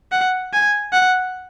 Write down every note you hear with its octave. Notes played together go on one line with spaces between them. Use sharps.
F#5
G#5
F#5